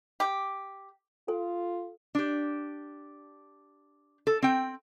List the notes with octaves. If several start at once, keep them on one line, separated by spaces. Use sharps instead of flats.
G4
F4 A4
D4 G4
A4
C4 G5